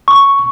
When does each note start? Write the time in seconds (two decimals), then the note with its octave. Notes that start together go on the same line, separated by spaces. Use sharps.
0.08 C#6